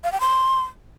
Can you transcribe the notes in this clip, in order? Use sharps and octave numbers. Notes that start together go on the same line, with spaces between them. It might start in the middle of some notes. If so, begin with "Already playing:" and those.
F5
G5
C6